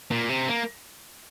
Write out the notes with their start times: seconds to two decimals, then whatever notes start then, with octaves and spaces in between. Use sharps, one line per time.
0.11 A#2
0.29 C3
0.48 A#3